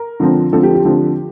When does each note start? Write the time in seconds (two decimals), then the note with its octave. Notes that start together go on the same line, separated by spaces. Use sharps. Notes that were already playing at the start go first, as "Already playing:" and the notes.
Already playing: A#4
0.20 D3 F3 C4
0.52 D3 F3 C4 A4
0.63 G4
0.74 G4
0.85 D3 F3 C4